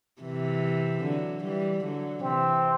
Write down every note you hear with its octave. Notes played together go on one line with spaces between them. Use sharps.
C3 E3
D3 F#3
E3 G3
D3 F#3
C3 E3 C4